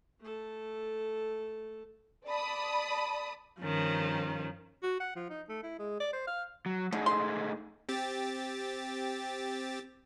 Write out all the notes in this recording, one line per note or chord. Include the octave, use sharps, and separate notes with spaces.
A3 A4
D5 A5 B5 D#6
G2 D#3 F3 C#4
F#4
F#5
F3
D#4
A3
E4
G#3
D5
C5
F5
F#3
D3 A3 D#4 G#4
C6
C4 G4 A6